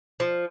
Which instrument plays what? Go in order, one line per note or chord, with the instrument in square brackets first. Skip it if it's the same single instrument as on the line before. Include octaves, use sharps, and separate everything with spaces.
[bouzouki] F3